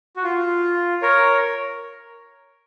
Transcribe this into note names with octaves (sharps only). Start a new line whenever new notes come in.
F#4
F4
A#4 C#5